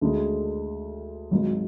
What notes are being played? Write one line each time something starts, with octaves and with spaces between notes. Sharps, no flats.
D2 D3 G#3
G#1 G#2 F#3